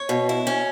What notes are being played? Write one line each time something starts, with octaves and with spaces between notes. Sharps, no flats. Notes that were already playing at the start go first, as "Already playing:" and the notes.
Already playing: C#5
B2
E4
C#4